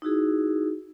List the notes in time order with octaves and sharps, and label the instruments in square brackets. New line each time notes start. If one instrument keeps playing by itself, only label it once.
[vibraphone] D#4 E4 F#4 G#4